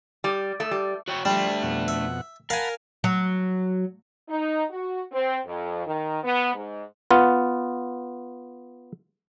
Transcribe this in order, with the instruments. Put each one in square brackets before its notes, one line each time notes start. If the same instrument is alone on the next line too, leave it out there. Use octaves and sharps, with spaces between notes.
[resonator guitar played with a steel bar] G3
A3
G3
[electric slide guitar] F#4 C#5 G5
[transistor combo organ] F3 C6 [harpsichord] G3 [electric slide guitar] A3 D4
[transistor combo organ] F2 B2 F#5
[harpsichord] E5
[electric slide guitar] A#4 [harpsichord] F5 G#5 [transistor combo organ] F#5 A5 B5
[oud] F#3
[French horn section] D#4
F#4
C4
F2
D#3
B3
G#2
[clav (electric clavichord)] B3 F4